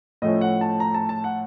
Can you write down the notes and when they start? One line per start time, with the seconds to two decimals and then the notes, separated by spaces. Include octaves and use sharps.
0.22 A2 F3 A3 C#4 D#5
0.41 F#5
0.61 A5
0.80 A#5
0.94 A5
1.09 A5
1.24 F#5